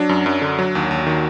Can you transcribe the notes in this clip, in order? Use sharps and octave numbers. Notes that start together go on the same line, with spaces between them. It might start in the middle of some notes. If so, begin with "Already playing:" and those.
Already playing: F#3 D4
F#2
F#2
D3
F#3
D#2
D#2
D#3